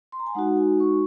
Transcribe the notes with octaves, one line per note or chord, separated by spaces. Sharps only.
C6
A#5
G#5
G#3 D#4 F#4 F#5
G#5
C#6